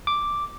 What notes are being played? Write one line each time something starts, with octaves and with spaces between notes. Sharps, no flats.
D6